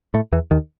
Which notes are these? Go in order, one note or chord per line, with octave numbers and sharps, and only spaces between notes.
A2 A3
E2 E3
D#2 D#3